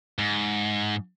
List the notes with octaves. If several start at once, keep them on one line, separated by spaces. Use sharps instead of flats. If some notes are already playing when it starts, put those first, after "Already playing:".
G#2